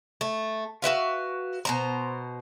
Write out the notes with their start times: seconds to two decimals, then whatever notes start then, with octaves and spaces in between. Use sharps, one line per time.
0.21 A3
0.82 F#4 B4 E5 F5
1.65 B2 C5 A#5